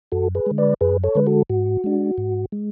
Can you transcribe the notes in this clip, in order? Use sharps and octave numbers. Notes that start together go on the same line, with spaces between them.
F#2 F#4 A4
G#4 B4
D3 G#3
B4 D5
F#2 G#4 B4
A4 C#5
D3 G#3 B4
F#4 A4
G#2 F#4
G#3 D4
G#2
G#3